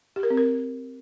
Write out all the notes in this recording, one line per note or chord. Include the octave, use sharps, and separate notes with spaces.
G4
A#4
C4
A#4